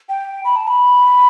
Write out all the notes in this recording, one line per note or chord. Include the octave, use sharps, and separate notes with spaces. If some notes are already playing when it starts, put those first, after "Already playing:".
G5
B5
A5
B5